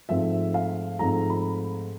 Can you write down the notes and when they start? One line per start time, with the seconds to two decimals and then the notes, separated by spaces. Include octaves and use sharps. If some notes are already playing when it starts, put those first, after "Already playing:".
0.09 G#2 F3 A3 C4 E5
0.54 F5
0.99 G#2 F3 A3 C4 A#5
1.30 B5